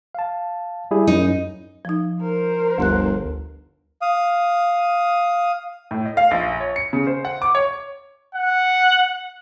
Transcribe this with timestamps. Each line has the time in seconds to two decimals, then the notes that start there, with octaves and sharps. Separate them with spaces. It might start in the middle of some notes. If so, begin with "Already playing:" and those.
0.15 F5 A5
0.91 G3 E4 G#4
1.07 F#2 D#4
1.85 F3 D#4
2.21 A#4 C5
2.78 G1 D2 C6 F#6
4.02 F5 D#6
5.91 A2
6.05 D#5
6.17 F5
6.31 A#1
6.60 C#5
6.76 C#7
6.93 C#3
7.07 C5
7.25 F#5
7.42 D6
7.55 C#5
8.35 F#5